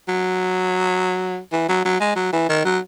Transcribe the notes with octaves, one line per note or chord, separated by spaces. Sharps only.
F#3
E3
F#3
F#3
G#3
F#3
E3
D#3
F#3